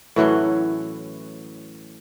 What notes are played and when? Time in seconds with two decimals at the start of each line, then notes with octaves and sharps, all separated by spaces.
0.16 A2 E3 F#3 C#4